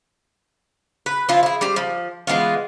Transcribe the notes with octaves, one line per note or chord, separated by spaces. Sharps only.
B4
F3 E4 F4
E4 G#4
G3 C5
F3
E3 G#3 B3 F4